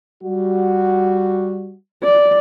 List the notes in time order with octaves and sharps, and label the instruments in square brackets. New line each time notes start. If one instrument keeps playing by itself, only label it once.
[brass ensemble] G3 F#4
[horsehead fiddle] D5